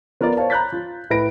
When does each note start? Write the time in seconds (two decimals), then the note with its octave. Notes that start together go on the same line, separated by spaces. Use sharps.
0.21 B3 F4 A#4 B4 D5
0.37 C5 C#5 F5 A5
0.50 A#5 B5 F#6 G6 A6 B6
0.73 F4
1.10 A2 E4 B4 B5 A#6 D7